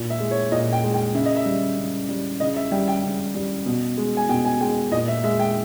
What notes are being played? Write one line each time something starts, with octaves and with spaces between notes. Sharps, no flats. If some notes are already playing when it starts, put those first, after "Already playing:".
Already playing: A#2
E5
G#3
C#5
A#2 D#5
G5
G#3
G5
C#3 E5
D#5
E5
G3
C#3
G3
C#3 D#5
E5
G3 G5
G5
C#3
G3
B2
G#3
G#5
B2 G5
G#5
G#3 G5
A#2 D#5
E5
G#3 E5
G5